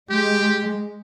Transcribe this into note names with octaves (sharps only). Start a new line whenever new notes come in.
G#3 G4